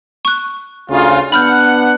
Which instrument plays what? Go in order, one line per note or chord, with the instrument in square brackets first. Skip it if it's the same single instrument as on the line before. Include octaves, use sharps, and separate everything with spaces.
[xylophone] C#6 F#6
[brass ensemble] D2 C#3 F4
[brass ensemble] B3 D4 F#5 [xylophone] B5 F6 G6